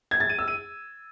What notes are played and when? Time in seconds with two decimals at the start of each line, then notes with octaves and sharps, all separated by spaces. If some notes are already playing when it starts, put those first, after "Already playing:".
0.11 G#6
0.20 A6
0.29 D#7
0.39 E6
0.48 D#7